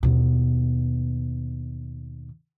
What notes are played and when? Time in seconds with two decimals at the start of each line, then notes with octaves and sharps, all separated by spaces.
0.03 D#2 B2